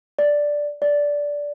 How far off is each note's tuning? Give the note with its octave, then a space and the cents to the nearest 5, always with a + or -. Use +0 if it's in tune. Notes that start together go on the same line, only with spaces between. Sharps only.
D5 +0
D5 -10